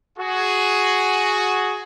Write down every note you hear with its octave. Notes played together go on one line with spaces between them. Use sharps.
F#4 G#4